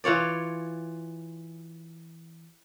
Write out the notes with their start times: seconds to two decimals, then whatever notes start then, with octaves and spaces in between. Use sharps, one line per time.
0.04 E3 F4 C#5 D5